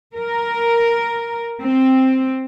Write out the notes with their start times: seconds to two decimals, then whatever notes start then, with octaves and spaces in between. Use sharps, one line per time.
0.15 A#4
1.63 C4